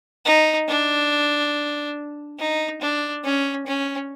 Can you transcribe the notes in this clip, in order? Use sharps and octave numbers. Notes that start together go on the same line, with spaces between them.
D#4
D4
D#4
D4
C#4
C#4